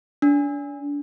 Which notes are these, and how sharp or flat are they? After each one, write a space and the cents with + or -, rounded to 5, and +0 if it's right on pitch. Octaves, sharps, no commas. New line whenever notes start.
D4 -30